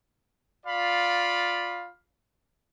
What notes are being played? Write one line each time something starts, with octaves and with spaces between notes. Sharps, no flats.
F4 D5 F5 B5